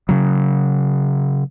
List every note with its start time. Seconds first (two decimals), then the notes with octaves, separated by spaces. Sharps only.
0.09 C#3 F#3